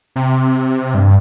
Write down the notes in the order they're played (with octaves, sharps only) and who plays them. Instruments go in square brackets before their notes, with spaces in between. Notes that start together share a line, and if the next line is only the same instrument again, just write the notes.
[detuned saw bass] C3
G2